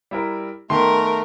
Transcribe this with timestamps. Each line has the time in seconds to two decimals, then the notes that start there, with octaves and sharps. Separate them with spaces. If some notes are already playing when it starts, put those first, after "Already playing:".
0.11 G3 E4 A#4
0.70 D#3 A3 B3 A#4 C6